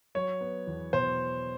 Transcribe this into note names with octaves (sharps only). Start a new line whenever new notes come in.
F#3 C#5
B3
E2
B2 C5